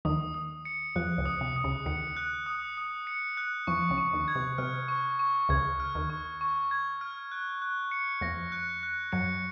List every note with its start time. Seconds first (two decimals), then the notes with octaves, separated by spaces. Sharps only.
0.05 D#2 D#3 D#6
0.34 D#6
0.65 C#7
0.96 F2 F3 F#6
1.18 C#2 C#3
1.25 D#6
1.41 C3
1.56 D#6
1.64 C#2 C#3
1.86 D#2 D#3 C#7
2.17 F#6
2.46 D#6
2.77 D#6
3.07 C#7
3.37 F#6
3.67 F2 F3 C#6
3.90 C#2 C#3
3.98 C#6
4.13 D#2 D#3
4.28 G#6
4.35 C3
4.58 C3 F6
4.88 C#6
5.19 C#6
5.49 C#2 C#3 G#6
5.80 F6
5.95 D#2 D#3
6.10 C#6
6.41 C#6
6.71 G#6
7.01 F6
7.32 F#6
7.62 F#6
7.91 C#7
8.21 F2 F3 A#6
8.52 F#6
8.83 F#6
9.12 F#2 F#3 C#7